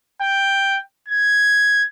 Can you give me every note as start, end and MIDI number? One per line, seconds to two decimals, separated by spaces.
0.22 0.80 79
1.09 1.85 92